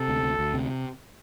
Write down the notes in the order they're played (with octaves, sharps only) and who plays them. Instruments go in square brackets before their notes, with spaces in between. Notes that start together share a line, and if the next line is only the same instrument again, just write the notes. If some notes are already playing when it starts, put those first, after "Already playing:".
Already playing: [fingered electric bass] C3 [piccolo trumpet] A4
[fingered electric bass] D2
D2
D2
C3